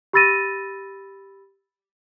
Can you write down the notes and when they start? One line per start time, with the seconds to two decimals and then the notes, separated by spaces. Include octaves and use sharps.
0.13 G4 B5 E6 A6 A#6 D#7